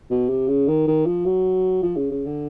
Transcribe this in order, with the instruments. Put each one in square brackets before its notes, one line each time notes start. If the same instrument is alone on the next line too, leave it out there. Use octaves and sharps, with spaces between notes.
[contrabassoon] B2
C3
C#3
D#3
D#3
F3
F#3
F3
C#3
C#3
D3